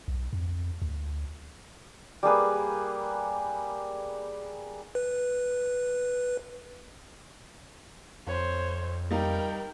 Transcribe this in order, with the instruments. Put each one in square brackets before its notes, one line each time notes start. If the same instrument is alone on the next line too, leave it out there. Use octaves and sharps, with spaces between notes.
[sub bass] B1
F2
D2
[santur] G3 A#3 G#4 B4
[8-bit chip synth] B4
[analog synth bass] F2 [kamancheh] C5 C#5
[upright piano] G3 D#4 F5 [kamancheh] A#4 G5